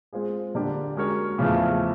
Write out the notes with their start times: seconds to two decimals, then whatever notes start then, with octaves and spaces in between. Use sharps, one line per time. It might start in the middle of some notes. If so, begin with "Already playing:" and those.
0.13 G#3 C4 F4 G#4
0.55 D3 G3 A#3 D4 G4
0.96 G#3 C#4 F#4 A#4 C#5
1.38 E2 C#3 F3 A3